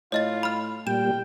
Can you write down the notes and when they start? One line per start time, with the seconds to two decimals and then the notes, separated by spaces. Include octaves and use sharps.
0.12 A2 F4 C#5 D#5 A6
0.43 B5 F6
0.87 A#2 G3 G5 E7